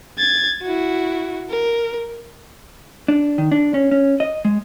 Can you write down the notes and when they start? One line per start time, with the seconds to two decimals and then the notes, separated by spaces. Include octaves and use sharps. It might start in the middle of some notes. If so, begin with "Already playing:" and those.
0.18 G#6 A6
0.63 E4 F#4
1.50 A#4
3.08 D4
3.38 D#3
3.52 D4
3.74 C#4
3.91 C#4
4.20 D#5
4.45 G#3